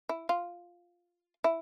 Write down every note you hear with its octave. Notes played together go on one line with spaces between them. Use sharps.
E4
F4
E4